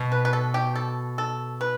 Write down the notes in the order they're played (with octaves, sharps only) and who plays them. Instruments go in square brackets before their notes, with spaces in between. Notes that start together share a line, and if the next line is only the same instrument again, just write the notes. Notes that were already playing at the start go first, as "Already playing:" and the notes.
Already playing: [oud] B2
[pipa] B4
B4
A4
G4
A4
A4
B4